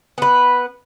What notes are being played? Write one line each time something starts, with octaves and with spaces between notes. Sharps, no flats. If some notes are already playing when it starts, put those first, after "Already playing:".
B3 B4